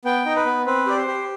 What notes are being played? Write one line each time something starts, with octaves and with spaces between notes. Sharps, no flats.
B3 G5
D#4
B4
B3
C4 B4
G4 D5
C5
G4